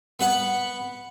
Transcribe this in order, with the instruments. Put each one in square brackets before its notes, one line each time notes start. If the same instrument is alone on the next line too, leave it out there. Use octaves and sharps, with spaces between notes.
[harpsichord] B3 B4 F#5 B5